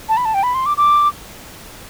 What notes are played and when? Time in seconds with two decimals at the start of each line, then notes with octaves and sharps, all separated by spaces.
0.09 A5
0.17 B5
0.25 A5
0.34 G5
0.43 B5
0.54 C6
0.66 D6
0.77 D6